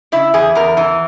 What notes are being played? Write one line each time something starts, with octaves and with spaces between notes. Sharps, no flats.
C#3 E4
E2 G#4
E2 A#4
E3